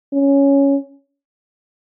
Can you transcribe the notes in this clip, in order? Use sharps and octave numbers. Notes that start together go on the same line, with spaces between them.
C#4